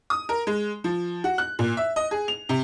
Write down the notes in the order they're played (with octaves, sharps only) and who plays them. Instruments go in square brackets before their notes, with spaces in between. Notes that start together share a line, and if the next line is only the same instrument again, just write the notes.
[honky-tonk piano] D#6
A#4
G#3
F3
F#4
F#6
A#2
E5
D#5
G#4
F7
C3